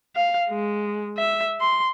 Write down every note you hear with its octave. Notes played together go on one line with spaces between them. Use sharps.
F5
G#3
E5
C6